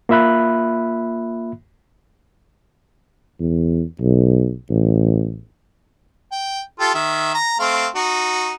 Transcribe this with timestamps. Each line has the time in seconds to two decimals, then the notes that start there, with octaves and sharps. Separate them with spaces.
0.09 A#3 F4 E5 B5 F#6
3.40 E2
4.01 B1
4.70 A1
6.32 G5
6.80 F4 G4 A4
6.95 D#3 E5
7.34 A#5
7.59 A3 C4 F5
7.96 D#4 F#4